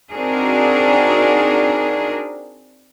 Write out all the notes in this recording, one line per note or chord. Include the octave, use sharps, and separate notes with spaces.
C4 D4 D#4 F#4 G#4 A#4